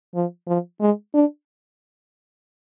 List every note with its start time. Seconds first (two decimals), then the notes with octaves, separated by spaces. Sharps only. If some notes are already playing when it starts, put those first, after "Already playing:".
0.15 F3
0.47 F3
0.81 G#3
1.14 D4